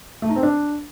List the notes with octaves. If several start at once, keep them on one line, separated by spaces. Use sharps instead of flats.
A3
D#4
C4
D4